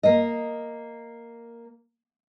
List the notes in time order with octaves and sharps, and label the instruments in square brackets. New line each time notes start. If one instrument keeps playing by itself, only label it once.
[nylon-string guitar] A#3 D#5